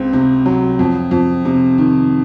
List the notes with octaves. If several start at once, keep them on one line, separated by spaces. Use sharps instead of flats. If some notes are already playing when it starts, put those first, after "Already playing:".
Already playing: C#2 C4
C3
F#3
F2
F2
C3
D#3